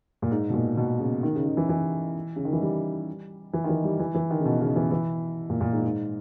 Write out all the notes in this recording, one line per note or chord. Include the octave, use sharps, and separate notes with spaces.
A#2
G#2
B2
A#2
B2
C#3
D#3
C#3
C#3
E3
E3
C#3
D#3
E3
G3
E3
D#3
E3
G3
E3
E3
D#3
C#3
B2
C#3
E3
E3
A#2
A#2
G#2
G#2